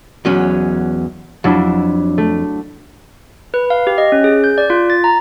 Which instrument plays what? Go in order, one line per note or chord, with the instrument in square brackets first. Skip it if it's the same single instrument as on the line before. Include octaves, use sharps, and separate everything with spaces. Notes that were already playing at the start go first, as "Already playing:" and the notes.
[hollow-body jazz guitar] E2 F#3 C#4
[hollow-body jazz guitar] F2 [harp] F#3 D4 E4
[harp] A3
[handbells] B4
F5
G4
D#5
C#4
G#4
G6
D5
F4
A6
A#5